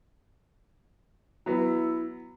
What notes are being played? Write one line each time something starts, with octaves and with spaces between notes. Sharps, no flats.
F#3 B3 E4